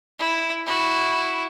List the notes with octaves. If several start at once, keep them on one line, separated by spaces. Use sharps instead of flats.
E4
E4 F#4